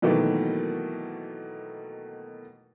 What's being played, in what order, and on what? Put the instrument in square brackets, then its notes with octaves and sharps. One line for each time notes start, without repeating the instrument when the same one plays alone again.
[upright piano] B2 D#3 E3 F#3 A3 A#3